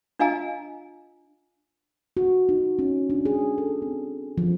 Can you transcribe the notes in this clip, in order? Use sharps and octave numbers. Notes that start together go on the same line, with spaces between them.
D4 F4 D#5 F5 G#5 A#5
F#4
D#4
C#4
D4
G#4
A4
C4
F3